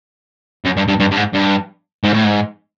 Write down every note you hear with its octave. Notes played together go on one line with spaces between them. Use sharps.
F#2
G2
G2
G2
G2
G#2
G2
G#2
A2
G#2